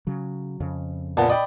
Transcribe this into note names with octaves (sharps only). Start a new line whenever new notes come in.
C#3 F#3
F2 C#3
A#1 A#2 B3 A5
D5 D#5 G5 B5